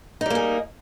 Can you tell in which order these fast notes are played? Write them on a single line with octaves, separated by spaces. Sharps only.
D#4 G3 A#3 G#4